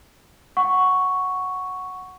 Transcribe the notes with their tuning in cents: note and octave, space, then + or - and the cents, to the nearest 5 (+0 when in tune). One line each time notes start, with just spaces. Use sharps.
F#5 +0 C#6 +0